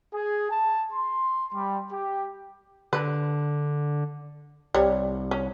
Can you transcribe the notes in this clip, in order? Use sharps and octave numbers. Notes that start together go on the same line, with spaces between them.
G#4
A5
C6
G3
G4
D3 B4
C2 G3 C#5
C#4